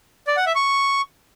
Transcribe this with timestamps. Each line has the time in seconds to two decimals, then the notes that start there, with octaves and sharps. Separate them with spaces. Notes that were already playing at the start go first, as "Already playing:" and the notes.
0.27 D5
0.37 F#5
0.46 E5
0.56 C#6